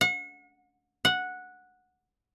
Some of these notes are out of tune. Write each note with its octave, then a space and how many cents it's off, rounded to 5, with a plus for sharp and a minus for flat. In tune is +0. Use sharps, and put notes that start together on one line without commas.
F#5 -35
F#5 -10